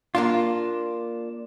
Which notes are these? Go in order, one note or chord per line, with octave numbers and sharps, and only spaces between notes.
A#3 D4 F4